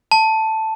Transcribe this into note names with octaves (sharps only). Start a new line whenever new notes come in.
A5